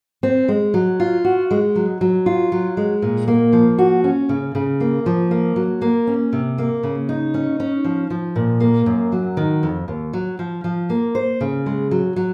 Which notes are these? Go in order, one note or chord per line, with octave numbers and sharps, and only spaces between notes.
C4
G#3
F#3
F4
F#4
G#3
F#3
F#3
F4
F#3
G#3
A#2
A#3
F3
F#4
C#4
C#3
C#3
A#3
F3
A#3
F#3
A#3
C#4
C3
A#3
C#3
D#4
C#4
C#4
F3
F3
A#2
A#3
F#2
F#3
D#3
F2
D#2
F#3
F3
F3
A#3
C5
C#3
G#3
F#3
F#3